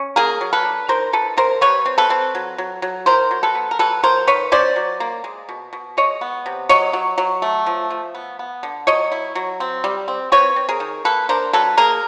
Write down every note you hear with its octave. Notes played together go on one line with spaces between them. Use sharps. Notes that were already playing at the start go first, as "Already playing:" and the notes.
Already playing: C#4
A#3 G#4 A#4
F#3
A4 B4
D4
D#3 A#4 C5
D#3 A4 B4
C3 A#4 C5
G3 B4 C#5
C4
A4 B4
C4
F#3
F#3
F#3
E4 A#4 C5
F#3
A4 B4
B3
A#4
F#3 A4 B4
F#3 A#4 C5
D#3 B4 C#5
C#4 C5 D5
F#3
A#3
G#3
B2
B2
G#3 C#5 D#5
B3
C3
F#3 C#5 D#5
F#3
F#3
A3
F3
F3
B3
B3
D3
F#3 C#5 D#5
E4
F#3
C4
G3
C4
C4 B4 C#5
C4
G#4 A#4
D#3
A#3 A4 B4
D4 A#4 C5
F#3 A4 B4
A#3 G#4 A#4